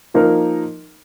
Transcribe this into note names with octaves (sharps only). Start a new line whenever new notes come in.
F3 A#3 D#4 A#4